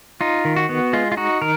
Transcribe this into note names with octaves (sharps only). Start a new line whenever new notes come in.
D#4 F4
D#3
F#4
B3
G#3 F4
F4
D#4 F#4
D#3 A#4